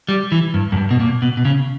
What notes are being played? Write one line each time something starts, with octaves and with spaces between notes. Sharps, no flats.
G3
E3
G2
F#2
G2
B2
A#2
B2
B2
C#3